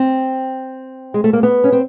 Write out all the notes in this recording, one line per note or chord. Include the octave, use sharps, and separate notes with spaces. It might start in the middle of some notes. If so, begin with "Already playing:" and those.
Already playing: C4
G#3
A3
A#3
B3
C#4
C4